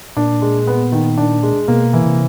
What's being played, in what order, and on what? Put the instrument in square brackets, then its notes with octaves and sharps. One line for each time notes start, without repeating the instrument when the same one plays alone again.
[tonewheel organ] A#2 [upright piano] D4
[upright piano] G#3
B3
D#3
D4
G#3
[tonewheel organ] B2 [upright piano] A#3
[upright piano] E3
[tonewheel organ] C3